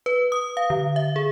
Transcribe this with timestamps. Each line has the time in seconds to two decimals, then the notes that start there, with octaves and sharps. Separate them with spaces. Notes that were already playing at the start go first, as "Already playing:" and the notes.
0.06 B4
0.32 D#6
0.57 F5
0.70 D3
0.96 E5
1.16 G#4